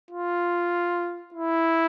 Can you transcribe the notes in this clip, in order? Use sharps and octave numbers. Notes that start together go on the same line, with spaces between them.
F4
E4